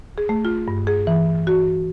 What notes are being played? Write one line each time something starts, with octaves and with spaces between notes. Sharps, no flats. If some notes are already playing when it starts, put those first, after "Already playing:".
G#4
A3
F4
G2
G#4
E3
F#4